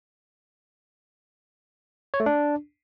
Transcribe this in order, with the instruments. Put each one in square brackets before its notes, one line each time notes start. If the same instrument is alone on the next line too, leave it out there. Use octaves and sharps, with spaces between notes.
[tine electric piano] C#5
A3
D4